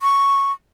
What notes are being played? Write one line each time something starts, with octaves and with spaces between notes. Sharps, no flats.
C#6